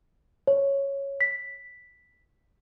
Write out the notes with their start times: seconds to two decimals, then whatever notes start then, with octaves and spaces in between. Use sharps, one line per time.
0.47 C#5
1.21 B6